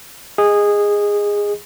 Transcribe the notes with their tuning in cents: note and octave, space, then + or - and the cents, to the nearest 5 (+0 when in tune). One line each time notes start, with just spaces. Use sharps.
G#4 -15 D#5 +0